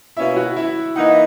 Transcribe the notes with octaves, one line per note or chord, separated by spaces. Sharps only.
B2 A#3 C#4 E4 E5
F#4 F#5
E4 E5
E3 A#3 D#4 F#5
E5